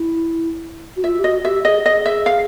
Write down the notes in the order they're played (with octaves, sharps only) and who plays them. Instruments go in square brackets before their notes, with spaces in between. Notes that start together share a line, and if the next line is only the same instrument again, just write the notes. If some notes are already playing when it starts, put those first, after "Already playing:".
Already playing: [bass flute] E4
F#4
[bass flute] F4 [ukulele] E5
[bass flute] G4
[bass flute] F#4 [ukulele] D#5
[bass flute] G4 [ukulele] E5
[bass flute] G#4 [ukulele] D#5
[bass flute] G#4 [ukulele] D#5
[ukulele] E5
F5